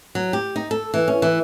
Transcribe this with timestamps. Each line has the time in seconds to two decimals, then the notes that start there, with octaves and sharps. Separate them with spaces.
0.15 F#3
0.33 G4
0.56 D#4
0.71 A4
0.94 E3
1.08 C#4
1.22 E3